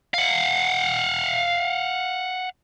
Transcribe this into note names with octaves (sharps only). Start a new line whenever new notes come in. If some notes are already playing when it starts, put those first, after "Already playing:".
F5 F#5